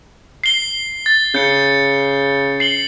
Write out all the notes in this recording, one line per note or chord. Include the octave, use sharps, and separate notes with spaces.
C7 G7
A6
C#3 G6 C#7
C7 F#7 G7